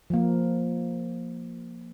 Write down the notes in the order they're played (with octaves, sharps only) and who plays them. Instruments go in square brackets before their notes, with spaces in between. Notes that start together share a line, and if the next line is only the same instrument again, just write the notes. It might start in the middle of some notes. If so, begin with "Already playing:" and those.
[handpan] F3 A#3